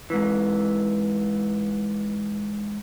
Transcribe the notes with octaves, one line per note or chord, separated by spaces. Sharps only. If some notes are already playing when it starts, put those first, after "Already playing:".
G#2 E3